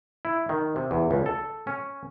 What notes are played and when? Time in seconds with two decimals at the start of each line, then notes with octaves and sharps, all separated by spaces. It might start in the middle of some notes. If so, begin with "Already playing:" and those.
0.25 E4
0.49 D#3
0.76 C3
0.91 E2
1.11 C#2
1.26 A4
1.67 C#4